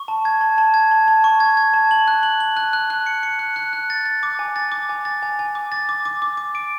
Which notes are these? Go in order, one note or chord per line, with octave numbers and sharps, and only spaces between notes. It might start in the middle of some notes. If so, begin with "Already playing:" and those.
Already playing: C#6
A5
G#6
A5
A5
G#6
A5
A5
C#6
G#6
G#6
A5
F#7
F#6
F#7
F#7
F#6
F#6
F#6
C#7
C#7
F#6
F#6
F#6
A6
A6
D6
G#5
A6
D6
G#5
A6
G#5
G#5
D6
A6
D6
D6
D6
D6
D7